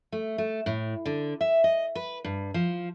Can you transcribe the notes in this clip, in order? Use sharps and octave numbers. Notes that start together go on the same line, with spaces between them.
A3
A3
A2
D3
E5
D#5
B4
G2
F3